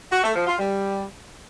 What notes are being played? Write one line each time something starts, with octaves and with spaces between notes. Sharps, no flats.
F#4
A3
F3
F4
G3